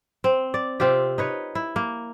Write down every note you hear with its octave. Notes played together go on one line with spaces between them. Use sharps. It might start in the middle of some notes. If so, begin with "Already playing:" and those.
C4
D5
C3 C4 F4 G4
D#4 B4 C#5
E4
A#3